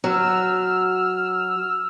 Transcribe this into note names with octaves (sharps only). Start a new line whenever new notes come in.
F#3 E6 F6